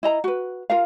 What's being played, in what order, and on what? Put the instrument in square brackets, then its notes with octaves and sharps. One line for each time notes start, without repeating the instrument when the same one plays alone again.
[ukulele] E4 D#5 A#5
F#4 B4
F4 A#4 F5